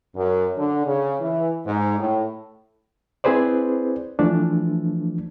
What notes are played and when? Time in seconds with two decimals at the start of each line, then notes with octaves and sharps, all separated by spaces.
0.14 F#2
0.56 D3
0.85 C#3
1.20 E3
1.65 G#2
1.98 A2
3.24 C4 E4 G#4 B4 C5 D5
4.19 E3 F3 A3 D4